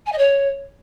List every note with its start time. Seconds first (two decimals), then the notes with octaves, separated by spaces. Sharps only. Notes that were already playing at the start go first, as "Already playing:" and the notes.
0.06 G#5
0.12 D#5
0.18 C#5